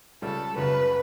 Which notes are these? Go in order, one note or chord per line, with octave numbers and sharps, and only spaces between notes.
C#2 C#3 G3 A4
F#1 F#2 C#3 B4